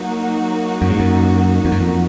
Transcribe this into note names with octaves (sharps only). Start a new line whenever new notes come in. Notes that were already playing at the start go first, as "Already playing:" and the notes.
Already playing: F#3 A#3 D#4 F#4
F#2
G#2
F#2
F2
F#2
F2